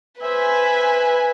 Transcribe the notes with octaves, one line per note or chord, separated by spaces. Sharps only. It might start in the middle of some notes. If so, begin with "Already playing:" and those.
B4 C5 E5 G#5